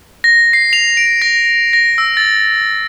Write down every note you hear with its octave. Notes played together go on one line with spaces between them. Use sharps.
A#6
C7
F7
D7
A#6
A#6
E6
A6